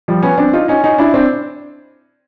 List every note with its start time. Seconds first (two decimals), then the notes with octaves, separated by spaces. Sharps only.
0.08 F3 G3
0.23 B3 C#4
0.38 C4 D4
0.53 D#4 F4
0.68 C#4 D#4
0.84 C#4 D#4
0.98 D4 E4
1.14 C4 D4